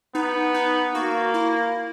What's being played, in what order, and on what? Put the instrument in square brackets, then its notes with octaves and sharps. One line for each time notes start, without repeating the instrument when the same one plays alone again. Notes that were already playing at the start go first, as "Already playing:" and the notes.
[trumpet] B3 [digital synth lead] D#4
[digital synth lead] D#4
[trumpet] A#3 [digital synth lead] F#4
[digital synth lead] E4